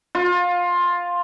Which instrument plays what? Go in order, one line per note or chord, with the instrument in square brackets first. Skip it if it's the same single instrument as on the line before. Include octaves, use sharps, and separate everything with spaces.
[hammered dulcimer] F4